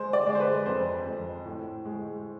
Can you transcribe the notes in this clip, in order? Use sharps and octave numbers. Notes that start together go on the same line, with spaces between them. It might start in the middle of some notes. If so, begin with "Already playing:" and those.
Already playing: G#3 C5
D5
G#3
C5
B4
F2 C5
F2
A2
G#3